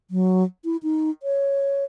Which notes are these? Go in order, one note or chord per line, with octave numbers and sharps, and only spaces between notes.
F#3
E4
D#4
C#5